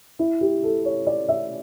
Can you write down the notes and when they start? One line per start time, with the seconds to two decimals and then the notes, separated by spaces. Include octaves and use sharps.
0.19 E4
0.41 G4
0.63 A4
0.85 C#5
1.07 D5
1.29 E5